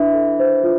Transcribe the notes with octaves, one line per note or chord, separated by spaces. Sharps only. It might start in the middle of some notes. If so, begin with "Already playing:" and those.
Already playing: E3 D4
A4
C5
F4